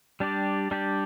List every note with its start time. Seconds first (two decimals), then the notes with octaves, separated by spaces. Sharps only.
0.20 G3 D4 G4 D5
0.71 G3 D4 G4 D5